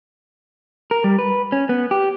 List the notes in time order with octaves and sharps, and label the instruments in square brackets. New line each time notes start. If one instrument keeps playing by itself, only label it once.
[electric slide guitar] A#4
G3
B4
C#4
B3
G4